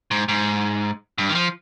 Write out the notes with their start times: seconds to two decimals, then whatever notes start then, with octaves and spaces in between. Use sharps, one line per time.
0.11 G#2
0.28 G#2
1.18 G2
1.29 D#3
1.35 F3